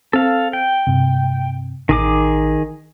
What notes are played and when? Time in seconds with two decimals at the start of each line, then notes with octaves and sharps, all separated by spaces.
0.13 C4 A4 F5
0.53 G5
0.87 G2 C3
1.89 A1 D#3 G#4 D6